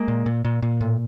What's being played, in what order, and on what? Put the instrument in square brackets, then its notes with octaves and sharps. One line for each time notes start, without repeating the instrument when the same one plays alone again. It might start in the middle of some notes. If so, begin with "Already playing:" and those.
Already playing: [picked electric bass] G#3 A#3
A#2
A#2
A#2
A#2
A2